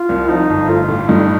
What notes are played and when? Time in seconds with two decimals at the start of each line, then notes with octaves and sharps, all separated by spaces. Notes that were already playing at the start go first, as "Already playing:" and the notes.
Already playing: F4
0.09 C2
0.29 F3 D#4
0.50 G1
0.69 A3 F4
0.88 A2
1.09 G2 D#4